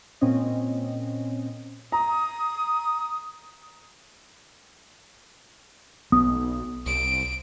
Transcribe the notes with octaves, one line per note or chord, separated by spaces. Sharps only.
A#2 C4 C#4 D#5
A#5 D#6
B1 B3 D#6
C2 D7